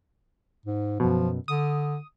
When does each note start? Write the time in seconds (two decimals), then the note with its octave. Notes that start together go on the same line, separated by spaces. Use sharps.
0.66 G#2
1.00 F#2 B2 F3
1.48 D3 D#6